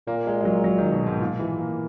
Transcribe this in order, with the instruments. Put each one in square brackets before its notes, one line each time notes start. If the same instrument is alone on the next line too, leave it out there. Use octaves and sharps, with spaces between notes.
[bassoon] A#2 [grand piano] A#3
[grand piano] G#3
G#3
F#3
F#3
D#3
B2
G#2
A#2
E3
A#3